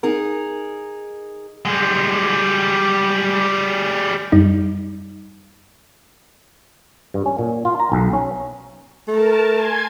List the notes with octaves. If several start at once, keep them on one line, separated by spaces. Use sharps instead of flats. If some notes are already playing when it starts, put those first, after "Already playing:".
D#4 G#4 A#4
G3 G#3
F#2 G3 D#4
G2
C#4
A#2
F4
A#5
B1
C#4
A3 A#4 A5
G#5 C6 G#6